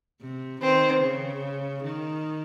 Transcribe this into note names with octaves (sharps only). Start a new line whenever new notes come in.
C3
D#3 C4
C#3
D#3